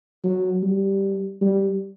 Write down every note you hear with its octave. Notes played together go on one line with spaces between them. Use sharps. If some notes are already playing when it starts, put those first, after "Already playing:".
F#3
G3
G3